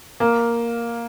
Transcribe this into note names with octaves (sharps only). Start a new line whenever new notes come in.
A#3